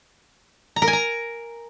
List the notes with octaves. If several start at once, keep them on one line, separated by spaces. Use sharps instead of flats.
A#5
A#4
G#5
A#5